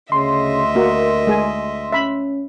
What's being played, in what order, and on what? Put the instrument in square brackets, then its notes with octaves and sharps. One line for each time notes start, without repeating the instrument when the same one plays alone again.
[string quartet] D2 D#5 E5 [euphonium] C#3 [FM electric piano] C6
[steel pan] A#3 F#4 [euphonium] A#4
[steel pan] G#3 G#4 G#5
[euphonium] C#4 [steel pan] E5 B5